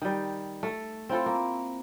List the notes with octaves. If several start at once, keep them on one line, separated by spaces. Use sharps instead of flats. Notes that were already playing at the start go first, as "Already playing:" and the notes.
D#3 G3
A3
C4 E4 F4 A4
A#3